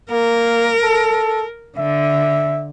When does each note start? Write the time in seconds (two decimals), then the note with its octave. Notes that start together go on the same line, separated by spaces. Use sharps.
0.11 A#3 A#4
0.83 A4
1.77 D3 E5